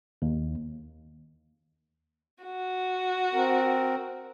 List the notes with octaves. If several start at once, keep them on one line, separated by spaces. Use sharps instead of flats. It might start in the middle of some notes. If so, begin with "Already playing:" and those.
D#2
F#4
C4 A#4